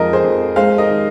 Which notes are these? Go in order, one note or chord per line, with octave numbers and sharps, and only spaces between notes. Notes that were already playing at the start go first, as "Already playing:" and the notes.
Already playing: F2 F3 G#3 A#4 D#5
G#4 C5
F2
G#3 C5 F5
A#4 D#5
D#3